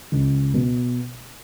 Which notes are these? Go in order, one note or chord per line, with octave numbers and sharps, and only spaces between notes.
C#2
B2